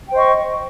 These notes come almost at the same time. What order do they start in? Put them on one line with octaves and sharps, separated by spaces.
G5 C5 D#5 C#6